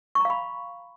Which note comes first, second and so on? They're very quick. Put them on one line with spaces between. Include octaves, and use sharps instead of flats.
C#6 A#5 F5 B5